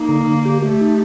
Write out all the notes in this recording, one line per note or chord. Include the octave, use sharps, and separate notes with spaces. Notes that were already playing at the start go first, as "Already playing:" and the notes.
Already playing: A#3 D#4
D3
D3
G4
A3 G4
D#4